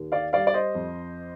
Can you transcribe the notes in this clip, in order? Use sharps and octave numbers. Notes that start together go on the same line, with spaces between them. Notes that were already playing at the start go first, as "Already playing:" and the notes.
Already playing: D#2
D5 F5
G3 D5 F5
D5
C5 D#5
F2